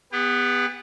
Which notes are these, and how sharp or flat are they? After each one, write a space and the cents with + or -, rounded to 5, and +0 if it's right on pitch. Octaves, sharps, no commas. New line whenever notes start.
B3 +5 G4 +45